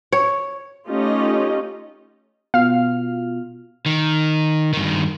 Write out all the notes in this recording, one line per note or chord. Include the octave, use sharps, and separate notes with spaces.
C#5
A3 C#4 D#4 F4 G4 D#5
B2 F4 F5 F6
D#3
G2 D#3